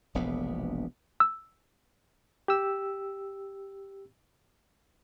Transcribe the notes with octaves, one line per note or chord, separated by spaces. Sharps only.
E1 A#1 C3 B3
E6
G4 E6